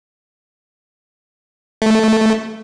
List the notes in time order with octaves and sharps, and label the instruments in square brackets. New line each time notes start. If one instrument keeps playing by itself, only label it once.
[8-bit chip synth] A3